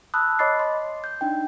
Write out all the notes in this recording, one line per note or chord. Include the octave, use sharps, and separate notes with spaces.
A5 B5 D#6 E6 F#6
C#5 D#5 B5 D6 A6 C7
C6
G6
D4 D#4 G5